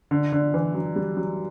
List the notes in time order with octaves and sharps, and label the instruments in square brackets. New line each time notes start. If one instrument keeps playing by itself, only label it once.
[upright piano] D3
D3
E3
F#3
G3
F#3